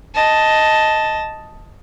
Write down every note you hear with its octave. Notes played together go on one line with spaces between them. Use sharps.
D#5 A5